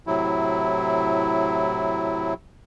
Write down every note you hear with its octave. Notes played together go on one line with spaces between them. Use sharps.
A2 C3 F#3 E4